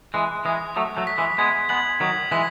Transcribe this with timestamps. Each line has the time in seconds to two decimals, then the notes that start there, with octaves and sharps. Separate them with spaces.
0.14 E3 G#3 F#6
0.45 E3 G#3 D#6
0.76 F#3 A3 D#6
0.97 F#3 A3
1.07 B6
1.18 E3 G#3
1.38 G#3 B3 G#6
1.69 G#3 B3 F#7
2.00 D#3 F#3 D#6
2.32 E3 G#3 B6